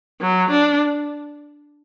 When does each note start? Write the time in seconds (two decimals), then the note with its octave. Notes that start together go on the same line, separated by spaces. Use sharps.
0.21 F#3
0.50 D4